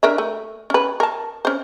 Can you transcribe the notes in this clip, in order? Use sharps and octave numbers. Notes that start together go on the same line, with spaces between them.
D4 A#4 E5
A3
C#4 B4
A#4 A5
C#4 C5